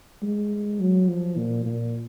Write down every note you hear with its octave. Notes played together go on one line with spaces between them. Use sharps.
G#3
F#3
F3
A#2
A#2